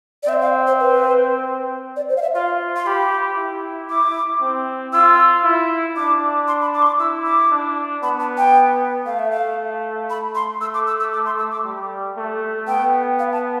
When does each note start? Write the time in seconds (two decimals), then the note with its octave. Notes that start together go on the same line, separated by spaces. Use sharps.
0.23 D5
0.28 C4 E5
0.42 F5
0.67 C5
0.80 B4
1.96 D5
2.09 C5
2.17 F5
2.22 E5
2.35 F4 F5
2.77 C6
2.86 G4 B5
3.38 E4
3.90 D6
4.41 C4
4.93 F4 E6
5.44 E4
5.96 D4 D6
6.48 C6
6.61 B5
6.74 D6
6.82 C6
6.87 D6
7.00 E4 E6
7.26 D6
7.52 D4
8.03 B3 B5
8.20 A5
8.38 G5
9.06 A3 F5
9.19 E5
9.31 F5
10.10 B5
10.35 C6
10.61 A3 E6
10.74 D6
10.87 E6
11.00 E6
11.13 D6
11.26 C6
11.39 E6
11.51 D6
11.65 G3
12.16 A3
12.68 B3 G5
13.19 F5
13.32 A5